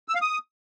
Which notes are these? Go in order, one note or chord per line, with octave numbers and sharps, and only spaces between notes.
E6
F5
D#6